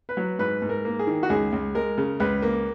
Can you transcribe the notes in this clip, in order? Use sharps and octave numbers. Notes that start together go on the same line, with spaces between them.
B4
F#3
G#2 B4
G#2
A#4
A#3
G#4
D#3
F#4
C#2 G#4
C#2
G#3 A#4
C#3
C#2 B4
A#3